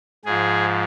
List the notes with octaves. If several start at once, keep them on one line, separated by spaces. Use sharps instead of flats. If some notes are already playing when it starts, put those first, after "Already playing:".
G#2 F3 G#4